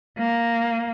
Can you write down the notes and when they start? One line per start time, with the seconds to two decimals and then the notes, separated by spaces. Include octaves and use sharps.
0.18 A#3